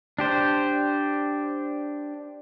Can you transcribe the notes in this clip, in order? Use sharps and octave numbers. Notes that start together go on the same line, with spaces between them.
D4 G4 C5